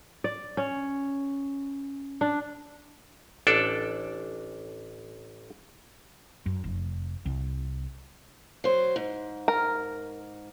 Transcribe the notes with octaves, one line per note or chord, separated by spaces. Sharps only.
D5
C#4
D4
A1 D4 A4 D5
F#2
F1
C2
F#3 C5
G#2
A#4